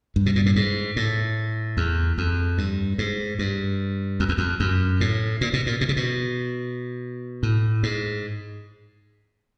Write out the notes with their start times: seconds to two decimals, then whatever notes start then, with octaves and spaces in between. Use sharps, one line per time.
0.16 G2
0.26 B2
0.36 A#2
0.46 A2
0.56 G#2
0.96 A2
1.77 E2
2.18 F2
2.58 G2
2.98 G#2
3.39 G2
4.20 F2
4.29 E2
4.38 F2
4.60 F#2
5.01 A2
5.41 A#2
5.53 B2
5.66 A#2
5.81 B2
5.89 C3
5.96 B2
7.43 A2
7.83 G#2